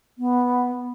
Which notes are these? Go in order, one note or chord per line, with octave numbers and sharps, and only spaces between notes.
B3